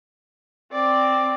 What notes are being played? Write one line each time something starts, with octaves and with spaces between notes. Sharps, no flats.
C4 D5